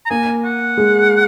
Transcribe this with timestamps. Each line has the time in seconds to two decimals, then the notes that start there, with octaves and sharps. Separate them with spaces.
0.06 A#5
0.10 A#3 G#5
0.45 F#5
0.77 G#3